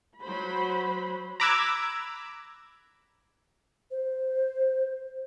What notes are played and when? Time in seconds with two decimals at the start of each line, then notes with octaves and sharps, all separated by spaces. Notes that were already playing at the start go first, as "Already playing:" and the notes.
0.21 F#3 C5 B5
1.40 A#5 B5 D6 E6 F#6 G#6
3.91 C5